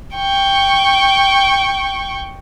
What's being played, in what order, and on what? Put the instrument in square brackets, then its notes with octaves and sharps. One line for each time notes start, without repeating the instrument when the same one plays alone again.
[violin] G5 C#6